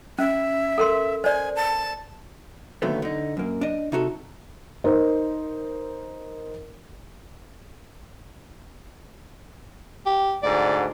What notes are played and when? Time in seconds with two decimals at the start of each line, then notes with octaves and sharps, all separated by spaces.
0.18 C#4 E5
0.78 A4 A#4 C6
1.24 C5 D5 G#5
1.56 A5
2.82 A#2 D3 D#3 F#3 A3 B3
3.02 D3 D#4
3.37 F#2 A#3
3.61 D4 D#5
3.92 C3 D#4 F#4 A4
4.84 D#4 A#4 C5
10.06 G4
10.43 D2 G#2 D5